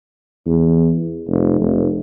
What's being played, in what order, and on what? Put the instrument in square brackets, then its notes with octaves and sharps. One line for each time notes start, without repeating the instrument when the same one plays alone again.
[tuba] E2
F1
F1